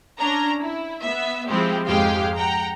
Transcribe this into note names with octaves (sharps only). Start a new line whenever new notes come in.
C#4 D4 A#5
E4
B3 E5
F3 G#3 C4 E4 G4
F2 G#2 G#3 G4 F5 G5
F#5 G5 A#5